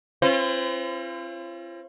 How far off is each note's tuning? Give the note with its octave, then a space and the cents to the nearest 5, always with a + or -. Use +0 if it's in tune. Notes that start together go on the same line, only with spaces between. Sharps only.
C4 +45 F4 -35 C5 -40